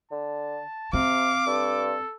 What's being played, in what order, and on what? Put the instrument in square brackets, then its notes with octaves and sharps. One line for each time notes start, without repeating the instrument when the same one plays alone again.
[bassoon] D3 [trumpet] A5
[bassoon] C3 [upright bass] C4 [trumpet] F5 [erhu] D6
[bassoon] G2 [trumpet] A4